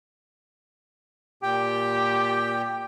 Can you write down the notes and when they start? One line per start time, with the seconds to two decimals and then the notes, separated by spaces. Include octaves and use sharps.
1.43 A#2 G4 G5